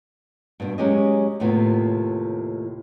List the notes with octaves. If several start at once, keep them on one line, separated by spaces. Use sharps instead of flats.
G2 B2
F#3 G#3 C#4 G4 D#5
D#2 A2 C3 B3 F4